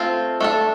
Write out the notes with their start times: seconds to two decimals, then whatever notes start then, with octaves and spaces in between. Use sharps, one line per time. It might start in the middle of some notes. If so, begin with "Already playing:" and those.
Already playing: A3 C4 F4
0.41 A3 D4 A4